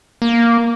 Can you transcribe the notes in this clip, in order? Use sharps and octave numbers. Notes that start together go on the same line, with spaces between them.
A#3